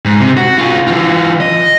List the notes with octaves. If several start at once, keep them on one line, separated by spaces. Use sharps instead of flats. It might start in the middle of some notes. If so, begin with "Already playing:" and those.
G#2
C3
F#4
F4 G#4
E3 F4
D#5